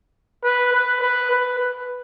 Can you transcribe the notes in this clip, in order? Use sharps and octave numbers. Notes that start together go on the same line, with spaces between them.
B4
B4
B4
B4
B4